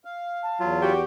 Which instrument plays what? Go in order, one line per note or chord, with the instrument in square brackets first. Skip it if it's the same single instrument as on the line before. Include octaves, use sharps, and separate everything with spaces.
[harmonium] F5
[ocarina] A5
[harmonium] E2 [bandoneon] F#3 F4
[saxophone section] F#4 G4